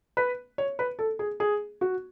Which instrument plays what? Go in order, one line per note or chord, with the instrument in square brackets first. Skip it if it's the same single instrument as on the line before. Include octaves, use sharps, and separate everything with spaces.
[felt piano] B4
C#5
B4
A4
G#4
G#4
F#4